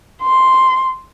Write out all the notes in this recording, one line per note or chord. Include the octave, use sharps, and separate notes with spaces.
C6